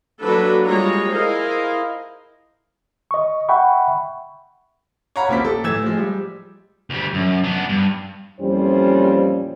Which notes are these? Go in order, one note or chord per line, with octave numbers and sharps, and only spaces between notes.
F#3 A#3 D4 F#4 A4 B4
G3 G#3 F4 C#5 A#5
E4 G#4 A#4 C5 D#5 F5
D#5 C#6
E5 F#5 G5 B5 C#6
C#5 F5 F#5 A#5 B5
A#1 D#2 A#3 C4 B6
A4
A2 E3 E6 G#6 E7
F3 G#3
G3
D2 G3
F#2
B3 D4
G2
F2 A#2 E3 G3 C#4 C5